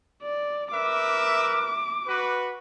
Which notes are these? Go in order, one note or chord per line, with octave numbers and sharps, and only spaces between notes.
D5
A#4 B4 E5 D6
F#4 B4